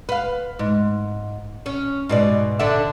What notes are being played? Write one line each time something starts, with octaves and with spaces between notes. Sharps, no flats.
B4 F5
G#2
C#4
G#2 B2 D5
D3 D4 E5